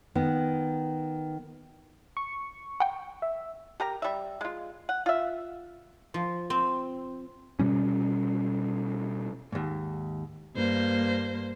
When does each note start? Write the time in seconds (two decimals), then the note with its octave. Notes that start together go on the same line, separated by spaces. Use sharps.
0.15 D#3 B3
2.17 C#6
2.80 F#5 G5
3.22 E5
3.80 G4 A#4 A#5
4.02 G3 E5
4.41 G#3 F4
4.89 F#5
5.06 F4 E5
6.14 F3
6.50 C4
7.59 B2 G3 C#4
9.52 D#2 G#2
10.56 G2 A#3 C5